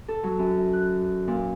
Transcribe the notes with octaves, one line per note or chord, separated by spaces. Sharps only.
A4
F#3
F#2
F#6
A#2